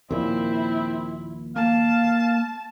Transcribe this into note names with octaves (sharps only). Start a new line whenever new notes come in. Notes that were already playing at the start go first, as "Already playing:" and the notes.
D#2 A#2 F3 C4 E4
A#3 F5 A5